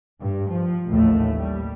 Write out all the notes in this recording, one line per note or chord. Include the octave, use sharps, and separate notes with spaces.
G2
F3
A1 D#2 A2 A3
G3